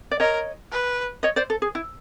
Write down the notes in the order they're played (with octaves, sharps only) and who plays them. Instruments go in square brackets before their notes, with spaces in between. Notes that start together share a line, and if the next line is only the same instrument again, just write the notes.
[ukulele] D5
[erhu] A#4 [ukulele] C#5 D#5
[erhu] B4
[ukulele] C#5 D#5
C5 D5
A4
G#4
E4